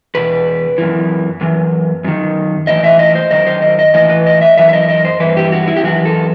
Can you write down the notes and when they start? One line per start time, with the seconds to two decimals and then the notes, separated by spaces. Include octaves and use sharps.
0.15 E2 B2 B4
0.78 F#2 E3
1.41 F#2 E3
2.04 F#2 D#3
2.67 A2 E3 D#5
2.84 E5
2.99 D#5
3.15 C5
3.31 F#2 D#3 D#5
3.47 C5
3.62 D#5
3.79 D#5
3.94 A2 E3 D#5
4.10 B4
4.26 D#5
4.41 E5
4.57 F#2 E3 E5
4.69 E5
4.73 D#5
4.89 D#5
5.05 C5
5.20 G2 E3 B4
5.37 G4
5.52 F#4
5.67 E4
5.77 G4
5.84 F#2 E3 F#4
6.05 A4